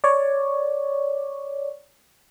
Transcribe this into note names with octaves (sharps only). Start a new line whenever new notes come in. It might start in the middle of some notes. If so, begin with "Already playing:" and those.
C#5 D5